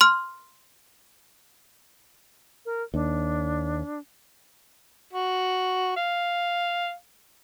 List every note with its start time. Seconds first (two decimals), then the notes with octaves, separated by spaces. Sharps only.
0.01 C6 F6
2.65 A#4
2.94 D#2 D4
5.13 F#4
5.97 F5